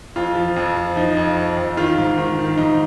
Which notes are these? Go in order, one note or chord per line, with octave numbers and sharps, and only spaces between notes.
F2 F4
F3
F2
F3
F3 D#4
F2
F2
F2
D#3 F4
G#2
D#3
D#3
G#2 D#4